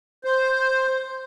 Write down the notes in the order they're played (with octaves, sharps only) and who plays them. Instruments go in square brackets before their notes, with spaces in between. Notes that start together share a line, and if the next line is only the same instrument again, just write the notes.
[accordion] C5